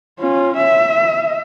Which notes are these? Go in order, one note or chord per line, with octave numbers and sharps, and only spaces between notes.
C#4 F4
E5